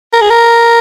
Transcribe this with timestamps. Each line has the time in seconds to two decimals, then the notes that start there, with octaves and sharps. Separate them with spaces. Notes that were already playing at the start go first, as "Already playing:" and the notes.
0.13 A#4
0.21 G#4
0.30 A#4